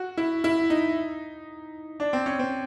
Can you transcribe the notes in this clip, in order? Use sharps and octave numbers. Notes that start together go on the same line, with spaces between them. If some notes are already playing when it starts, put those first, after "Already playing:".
Already playing: F#4
E4
E4
D#4
D4
C4
C#4
C4